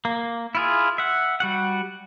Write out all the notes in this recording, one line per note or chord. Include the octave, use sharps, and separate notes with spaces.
A#3
E4 F4 G#4
E5 F#5
G3 F#4 F#5